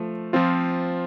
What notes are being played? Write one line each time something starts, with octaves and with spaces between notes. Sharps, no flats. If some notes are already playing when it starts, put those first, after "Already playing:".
Already playing: F3 A3
F3 C4 F4